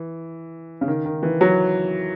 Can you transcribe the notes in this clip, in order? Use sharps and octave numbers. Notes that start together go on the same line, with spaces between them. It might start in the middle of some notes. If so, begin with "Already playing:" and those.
Already playing: E3
C#3
D#3
D#3
E3
F#3